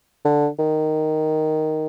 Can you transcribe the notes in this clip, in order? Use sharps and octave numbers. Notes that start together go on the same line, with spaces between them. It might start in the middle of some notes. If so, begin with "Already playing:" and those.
D3
D#3